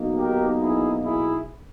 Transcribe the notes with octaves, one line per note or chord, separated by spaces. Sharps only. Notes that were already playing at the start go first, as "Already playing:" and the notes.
Already playing: B1 B2 A#3 D#4
G4 A#4
E4 G#4
E4 G#4